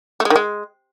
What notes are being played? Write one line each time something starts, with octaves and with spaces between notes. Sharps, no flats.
A3
G#3
D#3
G#3